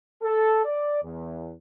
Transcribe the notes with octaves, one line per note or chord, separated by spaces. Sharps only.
A4
D5
E2